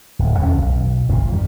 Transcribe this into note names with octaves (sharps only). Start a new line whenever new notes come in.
D1
E2 D#3 C#4
B1
G1 F2 A#2 F3
D#3 G3